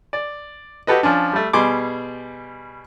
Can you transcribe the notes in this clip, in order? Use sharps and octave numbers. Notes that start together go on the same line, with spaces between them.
D5
F#4 G4 A4 B4 D#5
F3 C#4 D4
G3 A3
B2 G3 G#4 C6 D6